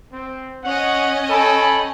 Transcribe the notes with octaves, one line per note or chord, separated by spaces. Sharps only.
C4
C#4 D#5 F#5
A4 G5 G#5 B5